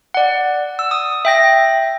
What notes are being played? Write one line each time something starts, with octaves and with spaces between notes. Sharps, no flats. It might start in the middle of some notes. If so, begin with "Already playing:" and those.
D5 F#5
E6
D#6
E5 G5 A#6